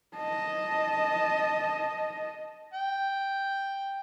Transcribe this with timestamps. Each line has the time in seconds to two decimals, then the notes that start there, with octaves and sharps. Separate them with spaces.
0.17 D#5 A5
2.74 G5